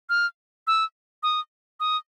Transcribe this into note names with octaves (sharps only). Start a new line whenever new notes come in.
F6
E6
D#6
D#6